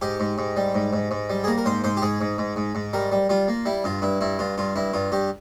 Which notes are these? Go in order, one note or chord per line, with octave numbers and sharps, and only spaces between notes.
G#2 G4
G#2
G#2
G3
G#2
G#2
G#2
G3
G#4
A#3 A#4
A#4
G#2 C5
G#2 C5
G4
G#2 G#4
G#2
G#2
G#2
G#2
G3 A#4
G3
G3 F4
A#3
G3 E4
G2 F4
G2 E4
G2 E4
G2 F4
G2 F4
G2 E4
G2 F4
G2 G4